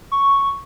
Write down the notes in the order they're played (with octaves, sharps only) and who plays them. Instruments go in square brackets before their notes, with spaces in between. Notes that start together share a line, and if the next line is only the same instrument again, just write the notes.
[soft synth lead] C#6